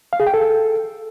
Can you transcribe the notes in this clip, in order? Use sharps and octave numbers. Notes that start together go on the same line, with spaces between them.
F5
G#4
G5
A4